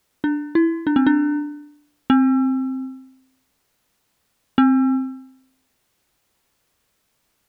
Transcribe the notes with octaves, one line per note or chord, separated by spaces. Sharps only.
D4
E4
D4
C4
D4
C4
C4